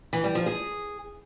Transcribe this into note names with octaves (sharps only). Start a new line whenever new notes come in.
E3
G3
F3
G#4